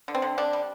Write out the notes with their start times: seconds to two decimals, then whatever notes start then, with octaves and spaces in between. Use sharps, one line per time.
0.08 D3
0.15 C4
0.22 D3
0.38 D3 D4
0.53 G3